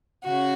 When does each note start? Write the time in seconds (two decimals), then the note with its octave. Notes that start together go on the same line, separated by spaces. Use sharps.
0.25 C#3 F#4